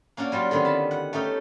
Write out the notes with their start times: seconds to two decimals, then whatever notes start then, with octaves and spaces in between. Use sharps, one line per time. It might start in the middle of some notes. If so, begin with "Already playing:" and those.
0.17 A#3 C#4 D4 F#4
0.32 F#3 G3 F4
0.51 D3 D#3 B3 C4
0.65 A5 B5
0.91 F#5
1.13 A3 C#4 D#4 G4